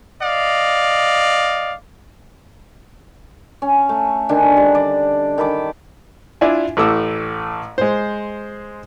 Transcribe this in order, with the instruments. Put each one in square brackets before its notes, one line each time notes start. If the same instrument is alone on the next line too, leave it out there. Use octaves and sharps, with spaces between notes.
[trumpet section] D5 D#5 F5
[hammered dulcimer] C#4
A3
D3 D#3 D4 G#5
G3
D5
D#3 A4 B5 D6
[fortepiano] D4 E4 F4 D5 E5 G#5
A1 A2 A3 D6 E6
G#3 C5